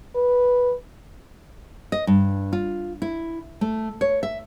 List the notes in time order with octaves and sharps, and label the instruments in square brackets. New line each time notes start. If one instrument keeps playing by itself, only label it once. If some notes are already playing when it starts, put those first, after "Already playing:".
[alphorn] B4
[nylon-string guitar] D#5
G2
F4
E4
A3
C#5
E5